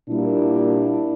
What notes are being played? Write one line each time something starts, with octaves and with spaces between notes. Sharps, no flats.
A#2 G3 A#3 D4 E4